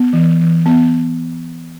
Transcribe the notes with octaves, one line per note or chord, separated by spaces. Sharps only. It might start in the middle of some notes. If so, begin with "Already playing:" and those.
Already playing: B3
E3
E3
B3